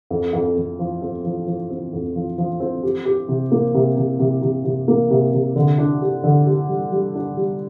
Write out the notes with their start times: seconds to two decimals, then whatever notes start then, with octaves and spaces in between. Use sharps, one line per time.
0.10 F2
0.33 F2
0.56 F2
0.79 F3
1.02 C4
1.24 F3
1.47 F3
1.70 C4
1.93 F2
2.15 F3
2.38 F3
2.60 C4
2.83 G4
3.05 G4
3.29 C3
3.51 A#3
3.74 C3
3.97 C3
4.19 C3
4.42 C3
4.65 C3
4.88 A#3
5.10 C3
5.33 C3
5.56 D3
5.78 D4
6.02 G4
6.24 D3
6.46 G4
6.69 G3
6.92 G3
7.15 D4
7.37 G3